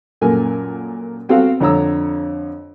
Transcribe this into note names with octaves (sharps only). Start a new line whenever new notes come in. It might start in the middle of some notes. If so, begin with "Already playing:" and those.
F#2 A#2 A4 A#4 G#5
B3 C4 F#4 A4 F5 F#5
F2 D3 C#5 A#5 E6